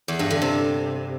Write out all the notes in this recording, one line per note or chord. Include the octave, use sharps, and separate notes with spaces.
E2
G2
D3
C3